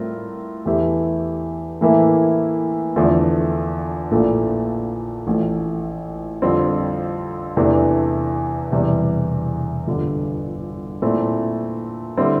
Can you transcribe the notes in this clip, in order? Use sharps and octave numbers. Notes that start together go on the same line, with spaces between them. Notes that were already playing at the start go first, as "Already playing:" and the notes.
Already playing: A2 G3 C4 F4 A#4
E2 E3 A3 E4 G4
A2 E3 A#3 E4 A4
E2 D3 F3 A3
A#1 A#2 A3 E4 A4
A1 A2 F3 A3
F2 D3 G3 C4
E2 C3 E3 A3 D4
E1 E2 C3 G3
G1 F2 D3 G3
A#2 A3 C4 E4
D3 G3 C4 E4